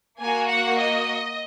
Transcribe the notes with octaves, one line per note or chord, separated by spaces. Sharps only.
A#3 F#4 G#5
F#5
D#5